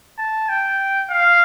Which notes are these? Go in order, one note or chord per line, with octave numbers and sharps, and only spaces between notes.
A5
G5
F5